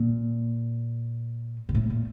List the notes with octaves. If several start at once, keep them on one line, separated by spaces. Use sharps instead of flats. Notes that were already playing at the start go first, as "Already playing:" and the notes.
Already playing: A#2
A#2
A2
A#2